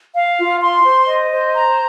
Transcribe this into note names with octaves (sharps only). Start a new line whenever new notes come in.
F5
F4
C6
C5
D#5
C5
A#5